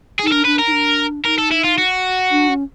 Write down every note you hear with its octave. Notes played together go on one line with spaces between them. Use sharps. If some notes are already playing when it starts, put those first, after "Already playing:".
G#4
D#4 A4
D4 A#4
D4 B4
A#4
D#4
D4
D#4 A#4
A4
E4
F4
F#4
D4
C#4